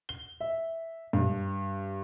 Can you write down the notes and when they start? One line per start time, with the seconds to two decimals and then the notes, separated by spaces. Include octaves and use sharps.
0.09 G7
0.40 E5
1.13 G2